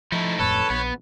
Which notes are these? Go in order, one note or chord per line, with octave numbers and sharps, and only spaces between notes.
F3 A3 D#4 E4
D1 F2 A2 A4 B4 C#5
A#1 B3